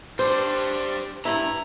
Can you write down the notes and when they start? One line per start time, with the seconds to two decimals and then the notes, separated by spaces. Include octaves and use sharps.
0.19 G3 D4 C5
1.25 G2 E4 A#5